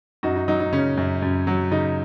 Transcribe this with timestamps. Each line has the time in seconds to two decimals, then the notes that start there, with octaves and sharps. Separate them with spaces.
0.23 F#2 D#4 F#4
0.36 D#4
0.48 F#3 D#4
0.60 D#4
0.73 C#3 C#4
0.97 F#2
1.22 F#2
1.47 F#3
1.71 C#3 D#4